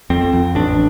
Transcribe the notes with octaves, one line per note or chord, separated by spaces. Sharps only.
F2 C4
F2
A1 D4